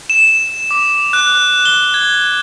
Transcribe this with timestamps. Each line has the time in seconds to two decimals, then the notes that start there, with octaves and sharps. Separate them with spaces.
0.10 E7
0.71 D6
1.13 F#6
1.65 G7
1.94 G#6